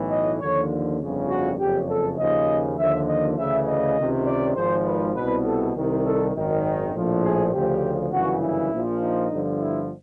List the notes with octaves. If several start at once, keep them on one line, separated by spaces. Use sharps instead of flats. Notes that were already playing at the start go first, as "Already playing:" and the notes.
Already playing: B1 A2 E3
D#5
D#2 D3 F3 C#5
G1 F2 C#3
F#4
F#1 F2 C#3 G4
A4
D#2 C#3 F3 D#5
D#2 D3 F3 E5
D#5
D2 C#3 E3 E5
D#5
C#2 C3 D#3
D5
G#1 G#2 F3 C5
B4
C2 B2 B4
A4
C2 C3 D#3
A4
G#1 F#2 D#3
A#1 A2 F3
G#4
D2 C#3 F3 G4
G1 F#2 C#3 E3 F#4
E4
A#1 A#2 F3
D#4
G1 G2 D3 F3
E4